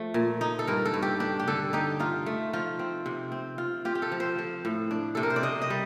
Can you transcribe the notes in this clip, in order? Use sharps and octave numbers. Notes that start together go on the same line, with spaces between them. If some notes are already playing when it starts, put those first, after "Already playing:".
Already playing: F3 A3
A#2
D#4
A4
G2 A#4
A4
G2
G4
D4 G4
G4
D3 A4
D#4 G4
D#4 F4
A3
F3 F4
C4
C3
C4
F4
F4 G4
G4
A4
F3
C5
F3
A2
D4
C3 A4
A#4
C5
D5
C3 D#5
D#5
G3